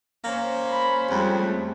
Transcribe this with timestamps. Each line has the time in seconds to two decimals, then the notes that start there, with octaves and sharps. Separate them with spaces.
0.24 A#3 C#4 C5
0.70 B5
1.10 F2 G3 G#3
1.39 A3